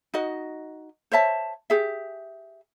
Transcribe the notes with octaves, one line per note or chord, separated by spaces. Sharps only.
D#4 F#4 D#5
C5 C#5 E5 A5
G4 G#4 E5